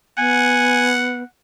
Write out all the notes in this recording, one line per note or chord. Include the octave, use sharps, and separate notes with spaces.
B3 F#5 G#5